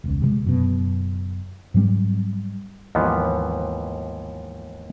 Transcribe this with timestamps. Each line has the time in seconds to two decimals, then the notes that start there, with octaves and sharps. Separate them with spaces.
0.04 E1 C#2
0.22 C3 E3 G#3
0.44 F#1 F#2 B2
1.74 G#2 F#3 G3 C4
2.95 D#2 G#2 E3 F3 B3